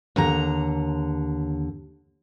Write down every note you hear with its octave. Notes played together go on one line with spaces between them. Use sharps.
D#2 D3 A#5